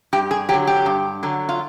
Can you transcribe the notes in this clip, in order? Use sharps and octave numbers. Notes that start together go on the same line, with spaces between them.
G2 G4
G#4
D3 F#3 G4
G4
G2
D3 F#3
F4